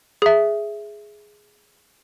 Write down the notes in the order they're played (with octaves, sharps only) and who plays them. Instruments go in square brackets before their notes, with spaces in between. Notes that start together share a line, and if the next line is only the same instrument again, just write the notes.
[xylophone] G#4 E5